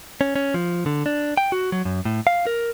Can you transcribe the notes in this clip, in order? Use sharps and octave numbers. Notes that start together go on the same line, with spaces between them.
C#4
C#4
F3
D3
D4
G5
F#4
F#3
F#2
A2
F5
A#4